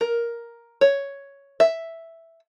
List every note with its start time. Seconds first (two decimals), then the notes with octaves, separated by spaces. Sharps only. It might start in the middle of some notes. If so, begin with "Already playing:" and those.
0.01 A#4
0.81 C#5
1.60 E5